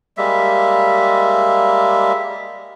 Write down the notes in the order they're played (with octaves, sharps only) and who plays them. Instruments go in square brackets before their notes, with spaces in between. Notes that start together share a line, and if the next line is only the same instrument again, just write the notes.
[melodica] G3 G#3 A#3 E5